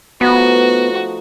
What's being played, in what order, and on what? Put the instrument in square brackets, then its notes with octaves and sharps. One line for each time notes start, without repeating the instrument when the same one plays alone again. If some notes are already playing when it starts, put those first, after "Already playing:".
[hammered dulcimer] F3 A3 D#4 [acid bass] B3 [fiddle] F#4